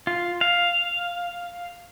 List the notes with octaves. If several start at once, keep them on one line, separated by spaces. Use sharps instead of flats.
F4
F5